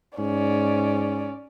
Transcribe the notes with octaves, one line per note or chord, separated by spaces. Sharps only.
G#2 C#4 D5